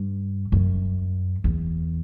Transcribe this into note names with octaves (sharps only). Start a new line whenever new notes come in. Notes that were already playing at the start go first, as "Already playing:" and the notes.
Already playing: G2
F#2
E2